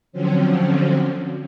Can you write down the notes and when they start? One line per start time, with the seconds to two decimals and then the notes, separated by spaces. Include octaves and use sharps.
0.12 D3 F3 F#3 C4 C#4